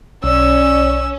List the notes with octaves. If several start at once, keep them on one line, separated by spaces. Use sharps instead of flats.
B1 C#4 D5 E6